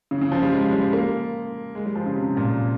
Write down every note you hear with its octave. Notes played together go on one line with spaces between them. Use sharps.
C#3
C#3
F3
G3
G#3
G3
A#3
G#3
G3
F3
C#3
C3
A#2